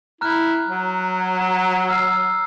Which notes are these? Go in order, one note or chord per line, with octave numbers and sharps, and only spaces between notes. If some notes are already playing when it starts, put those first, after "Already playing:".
E4 A#5 F6 F#6
F#3
A#5
E6 F6 C7